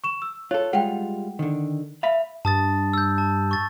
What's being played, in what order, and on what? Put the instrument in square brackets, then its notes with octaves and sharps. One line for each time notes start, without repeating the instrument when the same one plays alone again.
[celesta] C#6 E7
E6
[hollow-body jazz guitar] F4 A4 [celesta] C#5
[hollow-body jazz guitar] G3 G#3 F4 [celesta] F#5 G5
[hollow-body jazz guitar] D3 D#3
[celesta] E5 [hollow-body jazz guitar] F5 B5
[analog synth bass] G2 [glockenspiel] A5 D#6 A6
[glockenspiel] E6 G6
A5
C#6 A6